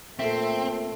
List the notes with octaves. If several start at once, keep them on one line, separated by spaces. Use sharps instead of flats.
A#2 A3 C4 A4 A#4 E5